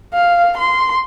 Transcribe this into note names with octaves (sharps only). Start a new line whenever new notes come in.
F5
C6